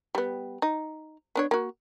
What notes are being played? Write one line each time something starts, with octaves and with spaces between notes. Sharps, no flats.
G3 B3
D#4
B3 D4 C#5
A#3 F#4